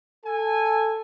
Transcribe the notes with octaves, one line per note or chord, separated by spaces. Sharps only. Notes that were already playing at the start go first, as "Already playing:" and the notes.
A4 G#5